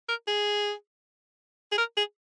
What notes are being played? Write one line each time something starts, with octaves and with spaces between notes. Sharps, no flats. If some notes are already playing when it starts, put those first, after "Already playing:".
A#4
G#4
G#4
A#4
G#4